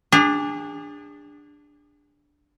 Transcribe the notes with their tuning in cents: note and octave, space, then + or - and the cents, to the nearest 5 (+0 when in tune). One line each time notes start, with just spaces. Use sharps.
D4 +0 G#4 -35